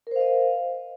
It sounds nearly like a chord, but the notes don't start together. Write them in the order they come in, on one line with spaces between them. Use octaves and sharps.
A#4 C5 F5 D#5